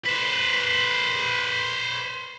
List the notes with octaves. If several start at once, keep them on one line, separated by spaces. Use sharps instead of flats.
B4 C5